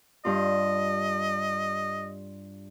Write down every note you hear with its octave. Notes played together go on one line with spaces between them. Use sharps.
G2 F4 D#5